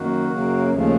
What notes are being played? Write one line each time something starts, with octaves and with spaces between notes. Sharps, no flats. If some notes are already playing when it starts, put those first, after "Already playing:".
Already playing: F#2 D#3 A#3 F#4
F#2 C#3 F#3 A#3
D#2 C#3 F3 A3